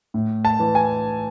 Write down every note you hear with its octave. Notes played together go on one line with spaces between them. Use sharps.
A2
A5
E3
G#5